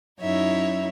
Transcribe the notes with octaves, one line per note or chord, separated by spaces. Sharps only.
F#2 F#3 D#4 E4 C#5 E5